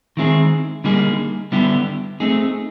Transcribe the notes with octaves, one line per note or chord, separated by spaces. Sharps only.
D#3 G#3 C4 E4 G#4
D3 G3 A#3 D#4 G#4
D3 G3 B3 E4 G4
A3 C4 D#4 G#4